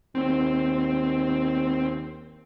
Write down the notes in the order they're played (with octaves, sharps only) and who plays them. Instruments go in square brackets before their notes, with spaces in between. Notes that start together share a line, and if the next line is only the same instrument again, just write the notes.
[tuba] D#2 [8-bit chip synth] C4